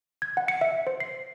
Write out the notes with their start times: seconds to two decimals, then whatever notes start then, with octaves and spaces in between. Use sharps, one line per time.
0.22 G#6
0.37 F#5
0.48 C#7
0.61 E5
0.87 C5
1.00 C7